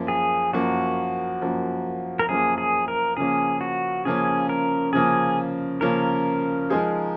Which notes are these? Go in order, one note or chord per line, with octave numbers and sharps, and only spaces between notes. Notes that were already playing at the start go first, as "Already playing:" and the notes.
Already playing: F#2 F3 A#3
G#4
F#2 F3 A#3 F#4
F#2 F3 A#3
A#4
F#2 F3 A#3 G#4
G#4
A#4
C#3 F3 A#3 C#4 G#4
F#4
C#3 F3 A#3 C#4 G#4
A#4
C#3 F3 A#3 C#4 G#4
C#3 F3 A#3 C#4 A#4
F3 G#3 D#4 G#4 C5